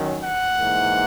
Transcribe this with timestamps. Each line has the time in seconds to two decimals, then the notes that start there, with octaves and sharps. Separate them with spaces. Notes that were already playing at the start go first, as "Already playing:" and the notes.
Already playing: D#3 F#3 C#4
0.21 F#5
0.59 G#2 E3 A#3